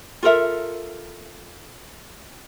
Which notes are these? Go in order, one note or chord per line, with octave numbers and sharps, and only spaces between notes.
F4 A4 A#4 E5